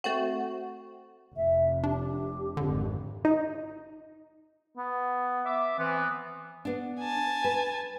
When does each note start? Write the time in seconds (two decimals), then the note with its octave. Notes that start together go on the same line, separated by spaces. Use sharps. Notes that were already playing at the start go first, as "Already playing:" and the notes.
0.04 A3 C4 F#4
1.36 F1 E5
1.84 D4 G4
2.57 G#1 F2 D3
3.25 D#4
4.78 B3
5.46 E5 D6
5.79 E3 B3 C4
6.65 B3 D4
7.00 G#5 A5
7.44 B4